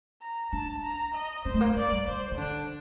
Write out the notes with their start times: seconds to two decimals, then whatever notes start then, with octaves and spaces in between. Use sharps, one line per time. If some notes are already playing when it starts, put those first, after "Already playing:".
0.22 A#5
0.53 D4 A5
0.83 A#5
1.14 D#5
1.45 C4 C5
1.54 A3
1.61 A#3
1.76 A3 D5
1.91 G3
2.07 D3 C5
2.32 D#3
2.38 D3 D4